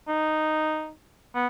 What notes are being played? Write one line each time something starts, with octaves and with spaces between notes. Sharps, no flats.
D#4
B3